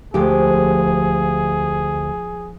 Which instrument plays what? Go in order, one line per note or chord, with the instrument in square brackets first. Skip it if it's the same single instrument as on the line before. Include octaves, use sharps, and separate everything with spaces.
[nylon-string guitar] D2 G4 [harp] F3 G#3 [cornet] G#4